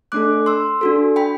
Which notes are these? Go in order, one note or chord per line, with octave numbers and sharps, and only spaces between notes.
A3 D4 A4 D6 F#6
C6 E6
D4 F#4 A4
G5 B5